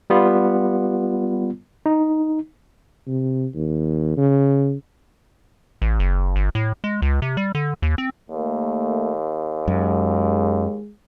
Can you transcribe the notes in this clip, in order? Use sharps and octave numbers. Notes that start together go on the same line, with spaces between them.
G3 B3 F4
D#4
C3
D#2
C#3
A1
F#1
G1
A2
G#3
C#2
C3
G3
D3
D#2
C4
D#2 A3 A#3
F#2 G#3